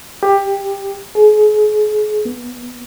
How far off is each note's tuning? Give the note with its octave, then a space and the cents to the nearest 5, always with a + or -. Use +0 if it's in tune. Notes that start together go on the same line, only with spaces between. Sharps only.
G4 +15
G#4 +35
B3 -10